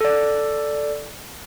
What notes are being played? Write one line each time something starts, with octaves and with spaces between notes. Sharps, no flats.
A4 D5